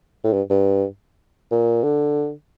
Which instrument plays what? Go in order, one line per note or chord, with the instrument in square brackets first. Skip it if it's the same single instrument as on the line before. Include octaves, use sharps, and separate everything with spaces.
[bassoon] A2
G2
G2
A#2
D3